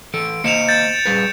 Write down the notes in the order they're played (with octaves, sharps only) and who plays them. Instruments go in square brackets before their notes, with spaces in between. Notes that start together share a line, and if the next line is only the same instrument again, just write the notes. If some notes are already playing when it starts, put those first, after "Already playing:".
[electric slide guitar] E3 A4 [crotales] D7
[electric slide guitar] A#3 C5 D#5 [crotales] C#7 E7 F7
[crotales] G6 A6 C#7
[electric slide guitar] G3 G#4 B4